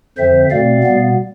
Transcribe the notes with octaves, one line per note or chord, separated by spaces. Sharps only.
F2 D3 F3 C4 C5 E5
B2 A3 C4 D5 F5
B2 G3 B3